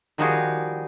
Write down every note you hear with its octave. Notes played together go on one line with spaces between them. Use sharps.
D#3 F3 G3 D#4 F#4 G#4